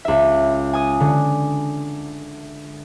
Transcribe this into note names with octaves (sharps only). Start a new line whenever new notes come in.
C#2 E5
G#5 D#6
D3